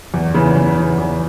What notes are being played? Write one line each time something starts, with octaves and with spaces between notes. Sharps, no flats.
E2
C#3 E3
E2
C#3 E3
E2